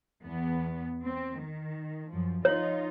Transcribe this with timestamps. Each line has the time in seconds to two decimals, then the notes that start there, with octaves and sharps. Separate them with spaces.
0.23 E2 B3
1.03 C4
1.37 D#3
2.10 F#2 F3
2.45 F3 D#4 F4 C#5